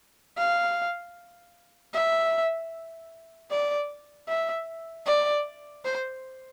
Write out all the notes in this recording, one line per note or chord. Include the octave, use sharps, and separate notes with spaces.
F5
E5
D5
E5
D5
C5